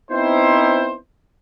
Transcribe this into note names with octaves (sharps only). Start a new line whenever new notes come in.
B3 C4 D#4 E4 C5